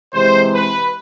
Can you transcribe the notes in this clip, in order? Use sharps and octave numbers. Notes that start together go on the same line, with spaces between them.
C3 E3 G#3 C5
B4